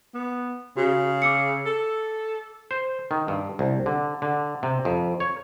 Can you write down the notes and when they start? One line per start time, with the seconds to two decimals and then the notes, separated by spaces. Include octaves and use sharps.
0.14 B3
0.77 C#3 F#4
1.22 D6 E6 C#7
1.66 A4
2.71 C5
3.11 D#3
3.28 G2
3.59 C2
3.86 D3
4.22 D3
4.63 C3
4.85 F2
5.20 C#5